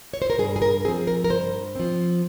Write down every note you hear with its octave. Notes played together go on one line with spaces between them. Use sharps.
C#5
C5
A#4
G2 G#4
G#4
A#4
F3 C4 G#4
A#4
A#4
G2 C5
F3 C4